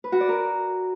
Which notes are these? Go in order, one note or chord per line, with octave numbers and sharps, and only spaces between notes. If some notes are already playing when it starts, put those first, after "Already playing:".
B4
F#4
D5
A#4